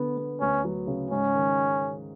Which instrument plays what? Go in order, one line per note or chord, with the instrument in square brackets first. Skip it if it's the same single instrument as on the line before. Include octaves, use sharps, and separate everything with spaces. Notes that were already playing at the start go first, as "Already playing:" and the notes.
Already playing: [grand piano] D3 B3
B3
[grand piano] D2 [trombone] C#4
[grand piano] F#3
C#3
[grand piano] G#2 [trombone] C#4
[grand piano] D#3